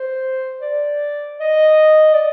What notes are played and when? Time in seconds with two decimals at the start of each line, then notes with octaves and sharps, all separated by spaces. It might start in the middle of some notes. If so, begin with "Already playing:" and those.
Already playing: C5
0.61 D5
1.40 D#5
2.13 D5